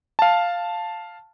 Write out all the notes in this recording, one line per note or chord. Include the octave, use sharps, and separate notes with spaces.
F5 A5